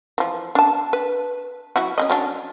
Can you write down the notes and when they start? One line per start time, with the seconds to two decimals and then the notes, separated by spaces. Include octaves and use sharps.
0.18 E3 F3
0.55 D4 A5
0.93 B4
1.76 F#3 E4 F#4
1.98 C#4 G#4 D#5
2.10 F#3 C#4 D4